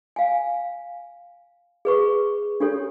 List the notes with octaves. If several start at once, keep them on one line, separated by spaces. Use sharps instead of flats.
F5 G#5
G#4 B4 C#6
D4 G4 A4 C#5